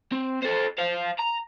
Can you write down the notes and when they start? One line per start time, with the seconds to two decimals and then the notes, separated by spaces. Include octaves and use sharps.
0.12 C4
0.42 A4 C5
0.78 C5 F5
1.19 A#5